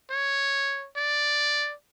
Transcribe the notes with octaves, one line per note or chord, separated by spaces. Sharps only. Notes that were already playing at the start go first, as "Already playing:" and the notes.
C#5
D5